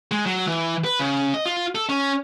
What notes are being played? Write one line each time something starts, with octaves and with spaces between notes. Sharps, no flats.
G#3
F#3
E3
B4
C#3
D#5
F4
A4
C#4